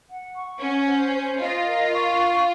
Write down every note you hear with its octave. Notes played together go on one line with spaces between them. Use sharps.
F#5
C#6
C#4 F#5
C5
C5
F4 D#5
A#4
C#6